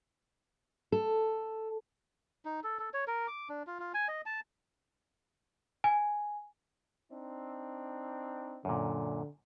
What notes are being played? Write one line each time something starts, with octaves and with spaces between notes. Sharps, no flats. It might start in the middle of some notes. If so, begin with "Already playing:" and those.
A4
D#4
A4
A4
C#5
A#4
D6
D4
F4
F4
G#5
D#5
A5
G#5
C4 D4 D#4
F#2 A#2 D3